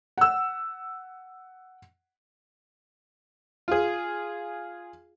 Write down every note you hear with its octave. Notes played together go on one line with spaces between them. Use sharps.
F#5 E6
F4 G#4